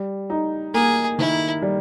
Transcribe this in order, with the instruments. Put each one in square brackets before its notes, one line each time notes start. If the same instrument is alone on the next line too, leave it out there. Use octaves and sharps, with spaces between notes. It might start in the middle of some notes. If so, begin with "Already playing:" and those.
Already playing: [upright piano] G3
D#4
[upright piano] A#3 [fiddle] G#4
[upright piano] D#3 [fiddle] E4
[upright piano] G3